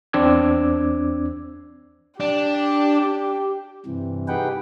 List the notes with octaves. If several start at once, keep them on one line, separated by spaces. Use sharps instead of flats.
E2 C4 D4 D6 E6 G#6
D4 G4
G2 C3 E3
D#4 G4 G#4 B4 F#5 G5